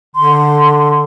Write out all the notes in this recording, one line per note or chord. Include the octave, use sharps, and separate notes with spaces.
D3 C6